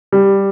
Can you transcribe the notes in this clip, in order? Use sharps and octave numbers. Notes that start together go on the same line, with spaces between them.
G3